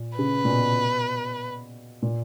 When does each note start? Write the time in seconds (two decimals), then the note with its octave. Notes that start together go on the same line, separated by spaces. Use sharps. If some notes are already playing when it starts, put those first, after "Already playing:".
Already playing: A#2
0.18 C#3 B4
0.45 A#2
0.49 B2
2.02 A#2